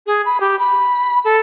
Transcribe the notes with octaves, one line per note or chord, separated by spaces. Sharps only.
G#4
B5
G4
B5
A4